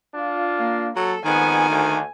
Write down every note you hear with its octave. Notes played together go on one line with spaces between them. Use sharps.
D4 F4
A#3
F#3 A4
F2 G#2 D#3 B3 G#5
D2